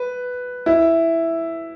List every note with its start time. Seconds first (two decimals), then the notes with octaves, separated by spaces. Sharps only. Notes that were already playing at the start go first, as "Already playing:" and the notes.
Already playing: B4
0.66 E4